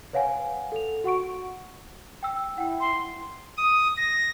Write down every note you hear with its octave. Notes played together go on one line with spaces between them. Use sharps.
B4 C#5 F5 F#5 G#5
A4 F7
F#4 F#5 C#6 D7
G5 E6
E4 F#5 G5
C6
D#6
A#6